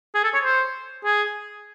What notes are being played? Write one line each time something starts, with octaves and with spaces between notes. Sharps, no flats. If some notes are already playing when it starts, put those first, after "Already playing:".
G#4
A4
C#5
C5
G#4